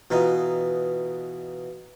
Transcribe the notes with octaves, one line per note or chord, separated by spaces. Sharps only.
B2 E3 D#4 F4